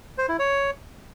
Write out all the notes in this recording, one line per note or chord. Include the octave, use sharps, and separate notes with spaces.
C5
E4
C#5